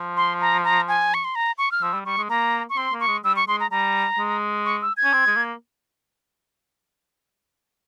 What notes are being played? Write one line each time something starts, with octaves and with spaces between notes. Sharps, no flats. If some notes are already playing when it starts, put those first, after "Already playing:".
Already playing: F3
C6
A#5
A#5
G#5
C#6
C6
A#5
C#6
F6
F3 E6
G3
G3 C#6
G#3
A#3 A#5
C#6
C4 C6
A#3
C#6
G#3
G3 E6
C#6
G#3 C6
A#5
G3 A#5
G#3
C#6
E6
G#6
C#4
C4
G#3
A#3